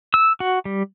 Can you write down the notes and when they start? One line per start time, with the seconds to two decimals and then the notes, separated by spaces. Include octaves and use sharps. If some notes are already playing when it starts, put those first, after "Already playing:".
0.14 E6
0.40 F#4
0.65 G3